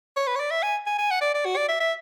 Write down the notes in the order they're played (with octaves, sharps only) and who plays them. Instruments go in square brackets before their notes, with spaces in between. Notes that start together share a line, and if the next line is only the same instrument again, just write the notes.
[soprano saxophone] C#5
B4
C#5
D5
E5
G#5
G#5
G#5
F#5
D5
D5
F#4
D5
E5
E5